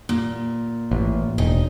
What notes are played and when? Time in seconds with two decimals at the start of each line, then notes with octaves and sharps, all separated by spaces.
0.09 A#2
0.91 A1
1.38 E1 D#4